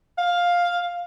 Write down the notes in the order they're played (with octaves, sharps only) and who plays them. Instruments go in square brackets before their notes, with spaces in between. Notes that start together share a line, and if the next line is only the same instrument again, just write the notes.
[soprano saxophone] F5